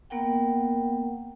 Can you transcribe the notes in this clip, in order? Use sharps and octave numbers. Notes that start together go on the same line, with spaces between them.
A#3 B3 A#4 F#5 G5